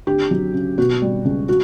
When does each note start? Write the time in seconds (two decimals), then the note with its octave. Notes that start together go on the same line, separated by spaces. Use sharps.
0.07 D2 G4
0.31 F#3
0.54 C#3
0.78 B2 F#4
1.02 G3
1.25 C#2
1.49 F#4